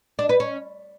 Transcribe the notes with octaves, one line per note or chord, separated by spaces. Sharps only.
D4
B4
C#4